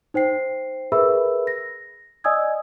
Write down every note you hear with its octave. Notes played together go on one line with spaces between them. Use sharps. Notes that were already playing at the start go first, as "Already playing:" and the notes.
D#4 C5 G5 C7
G#4 A#4 B4 E5 B5 E6
A#6
D5 D#5 G#5 D#6 E6 G#6